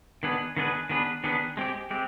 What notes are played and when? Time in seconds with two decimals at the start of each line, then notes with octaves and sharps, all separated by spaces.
0.23 D#3 B3 D4 G#4 B4
0.57 D#3 B3 D4 G#4 B4
0.89 D#3 B3 D4 G#4 B4
1.24 D#3 B3 D4 G#4 B4
1.57 G#3 C4 G4
1.91 G#3 C4 G4